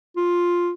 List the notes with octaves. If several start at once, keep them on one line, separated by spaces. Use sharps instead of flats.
F4